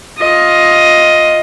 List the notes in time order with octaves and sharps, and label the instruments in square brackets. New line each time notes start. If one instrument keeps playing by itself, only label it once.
[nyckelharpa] F4 D#5